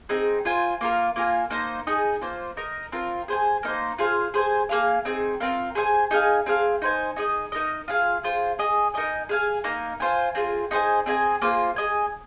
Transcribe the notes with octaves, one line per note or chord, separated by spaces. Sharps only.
C4 D#4 G#4
F4 C5 G#5
A#3 F4 A#4
A#3 F4 A#4 G#5
A#3 D#4 C5
D#4 G#4 D#5 G#5
A#3 F4 C5
D#4 A#4 D#5
C4 F4 A#4
G#4 C5 G#5
A#3 D#4 C5
F4 G#4 C5 F5
G#4 C5 G#5
A#3 G#4 F5
C4 D#4 G#4
C4 F4 A#4
G#4 C5 F5 G#5
D#4 G#4 F5 G#5
C4 G#4 F5
D#4 C5 G#5
D#4 G#4 D#5
D#4 A#4 D#5
F4 G#4 F5
F4 G#4 C5
G#4 D#5 G#5
D#4 A#4 D#5 G#5
G#4 F5 G#5
A#3 D#4 A#4
F4 C5 G#5
C4 F4 G#4
D#4 G#4 C5 G#5
C4 G#4 D#5 G#5
A#3 F4 G#4 C5
G#4 D#5 G#5